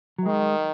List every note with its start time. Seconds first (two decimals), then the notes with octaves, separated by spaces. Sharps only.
0.19 F#3
0.25 D#3 G#3